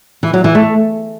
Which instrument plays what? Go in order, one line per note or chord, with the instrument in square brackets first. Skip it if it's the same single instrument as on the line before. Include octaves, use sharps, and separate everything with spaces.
[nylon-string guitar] E3
F#3
E3
A3